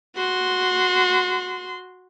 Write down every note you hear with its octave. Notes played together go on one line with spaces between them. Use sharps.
F#4 C6